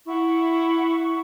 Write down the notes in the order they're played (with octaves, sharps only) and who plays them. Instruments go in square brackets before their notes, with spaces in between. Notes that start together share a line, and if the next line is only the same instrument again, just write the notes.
[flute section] E4 F#5 C#6